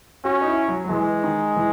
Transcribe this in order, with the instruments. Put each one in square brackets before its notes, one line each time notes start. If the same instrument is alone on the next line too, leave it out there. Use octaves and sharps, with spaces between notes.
[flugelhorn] C#4 [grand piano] F#4
[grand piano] D#4
E4
F#3
F#3
[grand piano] E3 [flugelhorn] G#3
[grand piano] D#3
E3